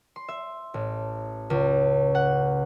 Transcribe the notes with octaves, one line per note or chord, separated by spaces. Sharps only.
C6
E5
A1
C#2
F#5